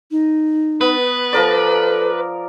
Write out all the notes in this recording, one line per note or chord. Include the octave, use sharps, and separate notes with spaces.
D#4
B3 B4
F3 A4 A#4 D5